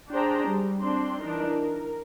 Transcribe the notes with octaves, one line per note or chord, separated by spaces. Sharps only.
D4 G#4 C5 G5 A5 A#5
G3
C4 D4 C6
E3 D4 D#4 A#4
A#4